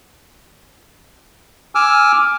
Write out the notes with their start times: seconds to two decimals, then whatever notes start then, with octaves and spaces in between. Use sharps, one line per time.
1.75 G#5 D6 E6 F6